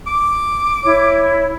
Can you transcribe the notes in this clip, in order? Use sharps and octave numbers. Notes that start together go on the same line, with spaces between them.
D6
E4 C#5